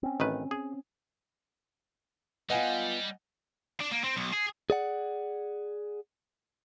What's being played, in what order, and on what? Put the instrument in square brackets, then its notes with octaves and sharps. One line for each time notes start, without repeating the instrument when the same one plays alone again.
[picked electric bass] C4 C#4
[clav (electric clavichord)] A1 D#3 B4
G#4
[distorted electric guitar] G3 [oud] B3 F4 [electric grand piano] D#5 F#5 G#5
[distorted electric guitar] D4
A#3
C4
B1
G#4
[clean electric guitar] G#4 D5 F#5